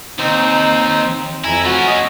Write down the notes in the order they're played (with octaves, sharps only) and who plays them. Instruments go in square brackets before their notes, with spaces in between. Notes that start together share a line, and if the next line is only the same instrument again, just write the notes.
[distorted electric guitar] D#2 [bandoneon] C4 D#4 C5
[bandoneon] F2 G#5 A#5 [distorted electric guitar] E4
[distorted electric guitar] A3 C#4 [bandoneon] F#4
[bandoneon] D#5